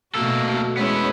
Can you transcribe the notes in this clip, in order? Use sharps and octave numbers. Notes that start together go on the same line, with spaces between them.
B2 A3 A#3 F#4 A4
G#3 B3 C#4 E4 B4